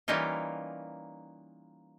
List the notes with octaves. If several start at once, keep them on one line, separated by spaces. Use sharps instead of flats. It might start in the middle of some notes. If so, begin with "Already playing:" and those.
E3 G3 A#3 C#4 D#4 F4